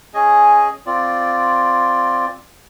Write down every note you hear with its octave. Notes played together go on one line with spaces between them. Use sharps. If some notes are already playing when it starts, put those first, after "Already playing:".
C#4 G#4 D#5 G#5
C4 F4 D5